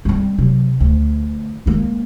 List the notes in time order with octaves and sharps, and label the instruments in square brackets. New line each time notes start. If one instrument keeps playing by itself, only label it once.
[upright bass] G3 C4
C3 F#3
D2
G#3 A#3